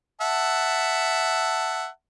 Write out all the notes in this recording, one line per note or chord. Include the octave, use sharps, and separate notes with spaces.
E5 F#5 A5